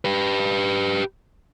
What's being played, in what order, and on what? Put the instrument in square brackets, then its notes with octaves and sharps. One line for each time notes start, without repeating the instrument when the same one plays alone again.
[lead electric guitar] G4 B4